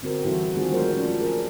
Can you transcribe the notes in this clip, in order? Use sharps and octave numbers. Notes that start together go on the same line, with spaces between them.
D3 C4 F#4 A#4
E3 G3 E4 F#4 A4 C5
D#3 G#3 C4 F4 F#4 G#4
F#3 A3 D4 A#4 C5 C#5
F3 C#4 D4
G#4 A#4